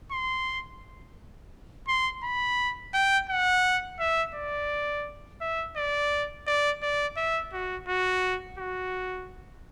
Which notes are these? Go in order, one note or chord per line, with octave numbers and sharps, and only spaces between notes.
C6
C6
B5
G5
F#5
E5
D5
E5
D5
D5
D5
E5
F#4
F#4
F#4